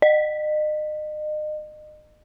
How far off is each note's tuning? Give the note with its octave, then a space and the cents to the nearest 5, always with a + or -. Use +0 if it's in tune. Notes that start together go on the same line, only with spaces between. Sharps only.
D#5 -35